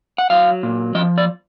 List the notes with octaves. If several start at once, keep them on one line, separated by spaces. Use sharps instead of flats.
F#5
F#3 F5
A#2
F3 D#5
D5